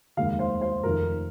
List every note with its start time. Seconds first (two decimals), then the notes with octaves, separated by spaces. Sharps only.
0.17 F1 D#2 D#3 G#3 F5
0.39 C5
0.61 C5
0.83 F1 F2 D#3 A#4